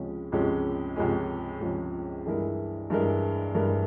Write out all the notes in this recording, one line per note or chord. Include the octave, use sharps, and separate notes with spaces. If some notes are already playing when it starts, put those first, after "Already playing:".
Already playing: C#2 C3 F3 G#3 C#4
C#2 C3 F3 G#3 C#4
C#2 C3 F3 G#3 C#4
C#2 C3 F3 G#3 C#4
G2 E3 G#3 E4 A#4
G2 E3 G#3 E4 A#4
G2 E3 G#3 E4 A#4